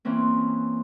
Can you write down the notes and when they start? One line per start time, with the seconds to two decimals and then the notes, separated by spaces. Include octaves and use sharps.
0.05 E3 A#3 C4 C#4